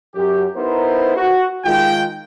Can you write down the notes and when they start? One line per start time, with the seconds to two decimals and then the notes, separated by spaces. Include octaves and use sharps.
0.15 F#2 G4
0.56 B3 D#4 E4 A#4 C5
1.16 F#4
1.65 D#3 G#3 F4 G5